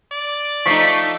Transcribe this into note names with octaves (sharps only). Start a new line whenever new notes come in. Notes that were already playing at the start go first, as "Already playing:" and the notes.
D5
F3 A3 D#4 C#6 B6 C7